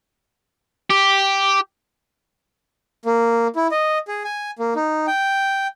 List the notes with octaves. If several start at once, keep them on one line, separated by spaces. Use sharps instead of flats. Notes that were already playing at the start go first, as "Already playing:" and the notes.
G4
A#3
E4
D#5
G#4
G#5
A#3
D#4
G5